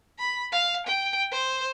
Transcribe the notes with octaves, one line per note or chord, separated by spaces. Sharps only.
B5
F5
G5
C5